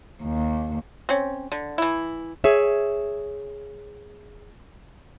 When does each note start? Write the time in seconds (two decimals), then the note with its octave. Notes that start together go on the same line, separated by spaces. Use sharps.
0.23 D#2
1.09 C4 C#4
1.52 D3
1.78 E3 E4
2.44 G#4 C#5 E5